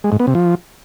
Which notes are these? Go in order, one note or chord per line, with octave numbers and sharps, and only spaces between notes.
G#3
G#2
B3
C3
F3